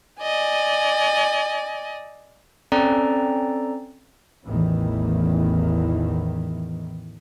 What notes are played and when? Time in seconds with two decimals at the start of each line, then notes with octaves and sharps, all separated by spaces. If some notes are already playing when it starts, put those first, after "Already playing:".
0.22 D5 D#5 G#5
2.72 C4 C#4 A4 D5 G5 A#5
4.48 A1 E2 D#3 E3